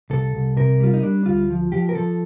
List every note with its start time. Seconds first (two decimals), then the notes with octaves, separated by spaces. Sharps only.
0.10 C2 A4
0.34 C2
0.57 C3 A#4
0.80 G3 F4
0.94 D#4
1.03 G3 D4
1.26 D2 F4
1.50 F3
1.72 F3 G4
1.89 A#4
1.95 F3 A4